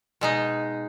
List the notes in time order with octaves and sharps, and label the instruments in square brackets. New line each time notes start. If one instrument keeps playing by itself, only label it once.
[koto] B2 G#3 D#4